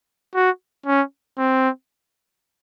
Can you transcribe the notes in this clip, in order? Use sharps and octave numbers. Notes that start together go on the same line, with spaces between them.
F#4
C#4
C4